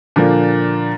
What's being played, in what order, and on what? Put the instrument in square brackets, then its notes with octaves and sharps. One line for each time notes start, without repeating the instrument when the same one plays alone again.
[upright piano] A#2 D3 F3 A#3